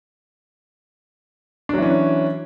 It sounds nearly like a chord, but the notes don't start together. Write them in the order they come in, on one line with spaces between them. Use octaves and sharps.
D4 F#3 E3 C#4